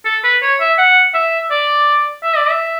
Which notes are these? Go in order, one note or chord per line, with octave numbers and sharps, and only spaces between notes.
A4
B4
C#5
E5
F#5
E5
D5
E5
D5
E5